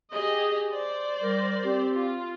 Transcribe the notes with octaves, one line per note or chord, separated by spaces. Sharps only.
G4 G#4 D#5
C5 D5
G3 A#4
C4 G4
F4